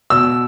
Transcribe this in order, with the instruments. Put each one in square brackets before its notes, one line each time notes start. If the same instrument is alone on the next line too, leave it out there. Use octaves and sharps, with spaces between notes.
[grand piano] B2 E6